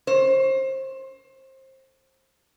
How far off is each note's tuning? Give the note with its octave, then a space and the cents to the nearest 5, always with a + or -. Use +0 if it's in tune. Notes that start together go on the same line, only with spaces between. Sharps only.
C5 +25